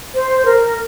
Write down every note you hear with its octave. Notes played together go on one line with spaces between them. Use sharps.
C5
A#4